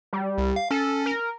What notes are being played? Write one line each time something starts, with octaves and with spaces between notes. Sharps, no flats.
G3
C2
F5
C#4 A4
A#4